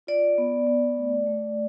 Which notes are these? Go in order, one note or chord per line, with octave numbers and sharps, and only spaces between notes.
F4 D5
B3
B3
A3
A3